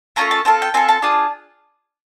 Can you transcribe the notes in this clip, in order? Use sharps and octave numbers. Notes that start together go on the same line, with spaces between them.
A3 C#4 F4 A4 A#5
A5
C4 F4 A4 A5
G5
C4 F4 A4 G#5
A5
D4 F4 G#4 A5